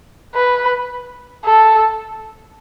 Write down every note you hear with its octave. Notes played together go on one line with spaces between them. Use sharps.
B4
A4